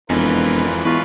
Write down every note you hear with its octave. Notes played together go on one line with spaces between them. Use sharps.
E1 F2 G#2 E3 F4 A#4 B4
E2 D#4 F4 B4 C#6